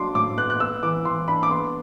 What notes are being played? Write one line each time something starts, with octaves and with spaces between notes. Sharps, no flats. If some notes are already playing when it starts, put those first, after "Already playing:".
Already playing: F#3 D4 C6 D6
A2 D6
B3 F#6
F#6
B3 E6
E3 D6
E3 C6
D4 B5
D6
B3 C6